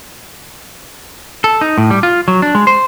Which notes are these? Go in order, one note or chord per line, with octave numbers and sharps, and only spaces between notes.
A4
D#4
A2
G3
F4
F#3
D4
G#3
C5